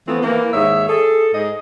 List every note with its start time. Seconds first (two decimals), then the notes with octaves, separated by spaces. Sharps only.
0.08 E3 F3 A3 B3 C4
0.22 E3 A#3
0.53 D#2 G#2 C#5 E5
0.88 G#4 A4
1.33 G#2 G#4 D#5